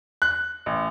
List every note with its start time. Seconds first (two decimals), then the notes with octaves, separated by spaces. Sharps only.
0.22 F#6
0.66 A1